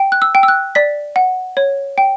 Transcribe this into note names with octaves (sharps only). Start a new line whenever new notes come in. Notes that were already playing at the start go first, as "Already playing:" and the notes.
Already playing: G5
F#6
E6
G5
E6
F#6
D5 B6
F#5
C#5
G5